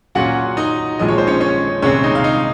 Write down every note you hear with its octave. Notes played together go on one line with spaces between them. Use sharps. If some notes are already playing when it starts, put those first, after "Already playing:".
A#2 F#3 C#4 F4 F#4 F#5
D#4 D#5
A#1 A#2 F3 G#3 D#5
C#5
C5
C#4 C#5
C#4 C#5
C2 A#2 G#3 C4 C#4 C#5
D#4 D#5
F5
D#4 D#5